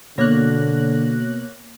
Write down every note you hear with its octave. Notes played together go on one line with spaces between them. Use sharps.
B2 D3 A#3 C#5 F#6 A#6